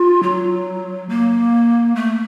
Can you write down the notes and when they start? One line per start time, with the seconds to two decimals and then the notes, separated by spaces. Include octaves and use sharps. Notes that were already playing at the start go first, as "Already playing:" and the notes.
Already playing: F4
0.23 F#3
1.09 A#3
1.96 A3